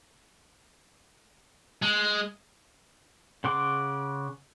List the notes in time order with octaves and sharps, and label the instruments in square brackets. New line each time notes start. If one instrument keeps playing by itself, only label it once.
[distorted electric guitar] G#3
[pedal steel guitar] C#3 F#5 C6 D6